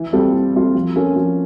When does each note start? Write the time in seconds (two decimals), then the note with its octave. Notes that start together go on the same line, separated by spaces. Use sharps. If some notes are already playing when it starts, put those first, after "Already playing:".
Already playing: E3
0.13 G3 C4 F4 A4
0.34 E3
0.54 G3 C4 F4 A4
0.75 F3
0.95 A#3 C#4 F4 A4
1.16 F3